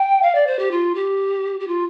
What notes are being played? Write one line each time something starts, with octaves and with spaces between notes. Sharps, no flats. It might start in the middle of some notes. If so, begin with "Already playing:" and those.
Already playing: G5
F5
D5
C5
G4
F4
G4
G4
F4